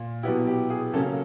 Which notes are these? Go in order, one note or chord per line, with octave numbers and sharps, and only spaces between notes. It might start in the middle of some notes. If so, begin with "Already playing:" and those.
Already playing: A#2
B2 F#3 B3 E4 G4
G4
G#4
C#3 F#3 A#3 C#4 A4